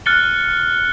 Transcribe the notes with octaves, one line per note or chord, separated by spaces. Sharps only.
F6 F#6 A6 C#7 G7